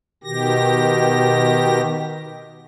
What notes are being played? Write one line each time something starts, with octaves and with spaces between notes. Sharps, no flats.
B2 D#3 G4 A#6